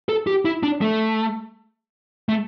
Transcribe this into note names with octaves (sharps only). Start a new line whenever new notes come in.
A4
G4
E4
D4
A3
A3